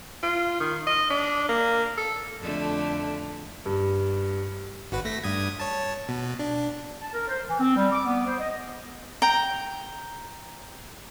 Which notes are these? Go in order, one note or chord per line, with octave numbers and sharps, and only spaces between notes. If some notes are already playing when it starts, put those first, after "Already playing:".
F4
D#3
D#5
D4
A#3
A4
F2 D3 A3
G2
G#1 F#4 B4
A3 A#6 B6
G2 D#6 G#6
C#5 A5
B2
D4
A5
A#4
C5
E3
C4
G3
D6
B3
C5
D#5
G5 A#5